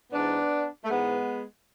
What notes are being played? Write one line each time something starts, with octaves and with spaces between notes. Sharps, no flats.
G#2 E3 B3 D4
A3
G#2 E3 G#3 B3